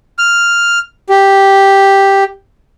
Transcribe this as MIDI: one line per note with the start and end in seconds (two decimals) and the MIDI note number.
0.18 0.79 89
1.09 2.24 67